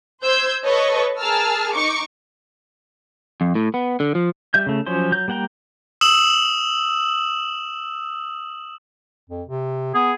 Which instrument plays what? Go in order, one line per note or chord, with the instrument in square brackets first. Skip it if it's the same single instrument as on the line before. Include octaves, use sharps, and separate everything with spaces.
[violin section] C5 E6 G6 G#6
A4 B4 C#5 D#5 C#6
G#4 A#4 A5 E6 F6
D#4 C#6 D6 C#7
[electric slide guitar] F2
A2
B3
D3
F3
[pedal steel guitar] G3 E5 G6
C#3 A3
F3 F#3 C#4 C5
F#3 G6
G3 A#3 F#5 G5 A#5
[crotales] D#6 E6 E7 F#7
[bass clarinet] F2
C3
[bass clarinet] B3 [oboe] G#4